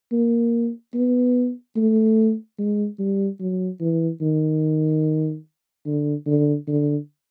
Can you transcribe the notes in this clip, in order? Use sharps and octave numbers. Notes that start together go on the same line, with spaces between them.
A#3
B3
A3
G#3
G3
F#3
E3
D#3
D3
D3
D3